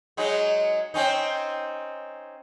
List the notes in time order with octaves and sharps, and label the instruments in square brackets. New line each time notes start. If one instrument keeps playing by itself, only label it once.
[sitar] F#3 G#3 D#4
C4 C#4 D#4